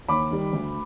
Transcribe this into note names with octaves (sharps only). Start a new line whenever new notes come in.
D#2 B5 D6
D#3 G3
D2